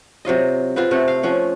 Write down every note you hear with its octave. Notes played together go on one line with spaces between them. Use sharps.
C3 F#3 F4 D#5
B3 C4 F4 G#4
C3 A3 F#5
F5
F3 C#4 F#5